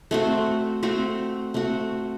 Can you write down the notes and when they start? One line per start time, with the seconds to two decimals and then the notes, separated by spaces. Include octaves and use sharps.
0.11 A3 C4 F#4
0.83 A3 C4 F#4
1.54 A3 C4 F#4